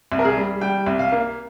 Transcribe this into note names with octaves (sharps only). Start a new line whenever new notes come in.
C2
A#4
G#4
G3
G3 G5
C2
F5
A#3